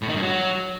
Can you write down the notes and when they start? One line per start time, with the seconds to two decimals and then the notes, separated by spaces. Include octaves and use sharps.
0.02 A2
0.09 D#3
0.15 G2
0.22 F#3